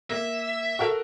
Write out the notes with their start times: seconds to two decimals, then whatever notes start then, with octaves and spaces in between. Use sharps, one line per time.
0.10 A#3 E5
0.79 F#4 A4 A#4